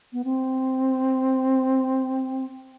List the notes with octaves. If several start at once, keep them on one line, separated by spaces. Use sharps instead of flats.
B3
C4